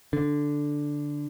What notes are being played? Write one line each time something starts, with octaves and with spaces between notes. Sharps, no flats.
D3